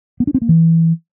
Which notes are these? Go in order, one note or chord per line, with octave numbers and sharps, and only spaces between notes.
B3
D4
C4
A#3
E3